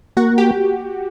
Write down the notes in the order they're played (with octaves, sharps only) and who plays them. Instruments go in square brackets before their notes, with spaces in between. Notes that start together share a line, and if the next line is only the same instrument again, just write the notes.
[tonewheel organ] A#3 [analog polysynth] F#4
[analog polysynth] G4